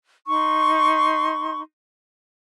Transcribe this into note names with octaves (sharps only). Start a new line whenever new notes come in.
D#4 C6 C#6